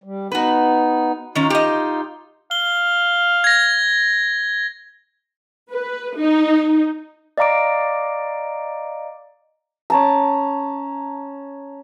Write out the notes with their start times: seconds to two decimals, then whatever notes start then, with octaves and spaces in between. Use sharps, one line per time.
0.04 G3
0.32 B3 D#4 F#4 B4
1.35 D#3 C#4 D#4 F4
1.50 G4 D#5
2.51 F5 G7
3.44 G#6 A#6
5.71 B4
6.17 D#4
7.38 D5 D#5 F5 A#5 D6 D7
9.90 C#4 A5 A#5